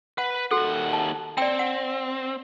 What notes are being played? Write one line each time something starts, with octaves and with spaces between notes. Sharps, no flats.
B4 F#5
D#2 F#4 A4 F#5
A5
C4 D5 G5
F#5